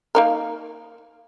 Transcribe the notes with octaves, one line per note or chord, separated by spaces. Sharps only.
A#3 D#4 A#4